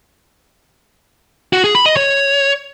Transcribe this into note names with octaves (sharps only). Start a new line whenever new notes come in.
F#4
G#4
B5
D#5
C#5